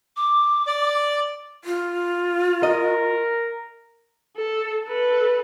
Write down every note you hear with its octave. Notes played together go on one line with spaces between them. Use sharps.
D6
D5
F4
A#4 D#5
A4
A4 B4